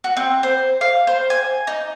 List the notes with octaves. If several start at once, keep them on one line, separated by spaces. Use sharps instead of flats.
F#4
C4
C5
F5
C5
G#5
D#4